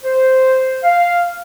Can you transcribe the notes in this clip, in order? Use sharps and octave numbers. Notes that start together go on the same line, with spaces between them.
C5
F5